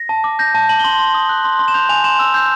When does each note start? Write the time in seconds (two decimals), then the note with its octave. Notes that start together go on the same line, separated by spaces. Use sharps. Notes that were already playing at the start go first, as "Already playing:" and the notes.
Already playing: A#6
0.09 A5
0.24 D6
0.39 G6 A#6
0.55 A5
0.69 A5 F#7
0.79 G7
0.84 C6 F#7
0.99 C6
1.14 D#6
1.29 F#6
1.45 C6
1.59 C6
1.68 E7
1.74 G6 F7
1.89 G#5 F7
2.04 C6 E7
2.19 E6
2.34 G6